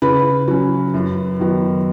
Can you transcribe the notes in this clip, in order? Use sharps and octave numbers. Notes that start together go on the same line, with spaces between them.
C#3 B4 B5
F#3 C#4
F#2
D#3 F#3 B3